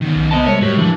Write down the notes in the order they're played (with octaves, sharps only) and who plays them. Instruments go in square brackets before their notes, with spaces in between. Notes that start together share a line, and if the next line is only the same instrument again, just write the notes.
[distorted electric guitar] D#3 B3
[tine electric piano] B1
[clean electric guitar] B3 D#5 A5 [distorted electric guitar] G4 C5
[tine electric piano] G3 G#3 A#4 [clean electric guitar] C#5
[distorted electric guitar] A2 [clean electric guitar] F#4 G4
[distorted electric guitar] E3 [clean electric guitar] F3 D4